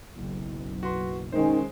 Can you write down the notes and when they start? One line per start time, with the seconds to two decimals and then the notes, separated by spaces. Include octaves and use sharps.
0.14 F#1 B1
0.83 F#4 B4 C6
1.33 D#3 G#3 C#4 C5